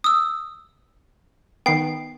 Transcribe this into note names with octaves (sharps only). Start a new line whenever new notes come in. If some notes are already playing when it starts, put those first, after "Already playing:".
D#6 E6
D#3 B3 G5 C7